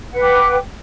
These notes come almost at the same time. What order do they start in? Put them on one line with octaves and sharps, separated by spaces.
F#5 B4 G5 D6